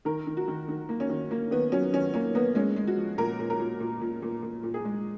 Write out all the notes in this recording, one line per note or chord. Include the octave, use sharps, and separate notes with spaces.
D#3 A#4
D#3
F#4
D#3
D#3
A#3
C#4
D#3
A#3
D#3 B3
F#3 C#4
D#3 C#4
A#3 C#4
A#3 B3
G#3 C#4
G#3
F#4
F3
A#2 A#4
A#2
A#4
A#2
A#2
A#2
A#2
A#2
A#2
G#4
G#3